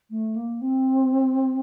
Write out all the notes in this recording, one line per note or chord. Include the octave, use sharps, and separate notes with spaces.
A3
A#3
C4